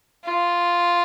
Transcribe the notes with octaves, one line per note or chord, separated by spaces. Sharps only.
F4